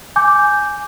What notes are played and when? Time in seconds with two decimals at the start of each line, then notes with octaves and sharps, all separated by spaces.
0.16 G#5 D6 G6